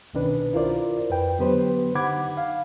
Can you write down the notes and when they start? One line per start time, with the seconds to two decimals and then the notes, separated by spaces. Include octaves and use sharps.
0.14 C2 B2 D#3 C#4 D4 B4
0.54 E4 F4 A#4 C5 D5
1.10 F2 B4 G5
1.39 D3 F#3 B3 G4 B4 C5
1.95 D3 D#4 F#5 B5 D6 G#6
2.37 F5